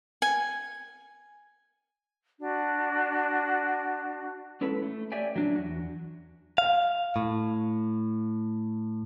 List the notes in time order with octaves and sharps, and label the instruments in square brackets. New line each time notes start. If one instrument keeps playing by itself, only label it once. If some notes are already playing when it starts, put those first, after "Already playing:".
[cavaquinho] G#5
[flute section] D4 F#4
[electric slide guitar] G#3 C#4 E4 A4 B4
A3
G4 C#5 D5 E5 G5 G#5
F#3 D4
E2 F#4
[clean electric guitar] F5
A2